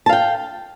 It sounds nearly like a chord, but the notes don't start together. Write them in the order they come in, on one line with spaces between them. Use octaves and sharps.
A5 F5 G5